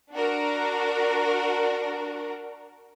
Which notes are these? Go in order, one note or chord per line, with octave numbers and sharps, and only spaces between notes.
D4 F#4 A#4